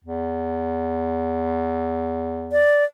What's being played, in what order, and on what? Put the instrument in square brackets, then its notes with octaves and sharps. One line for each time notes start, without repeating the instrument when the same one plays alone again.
[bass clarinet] E2
[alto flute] D5